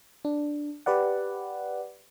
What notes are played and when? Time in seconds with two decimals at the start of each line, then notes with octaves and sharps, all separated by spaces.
0.25 D4
0.86 G4 B4 D5 F#5